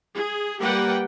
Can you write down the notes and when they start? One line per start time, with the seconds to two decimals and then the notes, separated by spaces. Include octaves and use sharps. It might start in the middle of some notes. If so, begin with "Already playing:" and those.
0.13 G#4
0.61 G3 A#3 G4 B4 F#5 G5